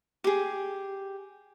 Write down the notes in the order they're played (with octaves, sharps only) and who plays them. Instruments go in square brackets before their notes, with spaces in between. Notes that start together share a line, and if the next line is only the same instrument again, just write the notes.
[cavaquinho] G4 G#4